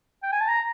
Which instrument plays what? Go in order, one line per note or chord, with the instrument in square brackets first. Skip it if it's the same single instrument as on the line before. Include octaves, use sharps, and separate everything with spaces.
[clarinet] G5
G#5
A5
A#5